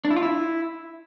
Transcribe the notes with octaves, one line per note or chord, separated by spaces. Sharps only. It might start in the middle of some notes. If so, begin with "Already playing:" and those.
D4
E4
F4
E4